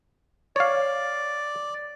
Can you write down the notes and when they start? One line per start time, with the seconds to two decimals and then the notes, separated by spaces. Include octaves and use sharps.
0.56 C#5 D5 F5